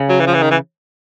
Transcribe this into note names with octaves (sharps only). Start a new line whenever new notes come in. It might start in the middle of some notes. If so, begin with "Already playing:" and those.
Already playing: C#3
F#3
E3
F3
E3
D#3
E3